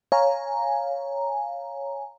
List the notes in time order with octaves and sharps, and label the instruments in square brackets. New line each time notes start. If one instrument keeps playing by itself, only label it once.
[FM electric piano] C#5 F5 G#5 A#5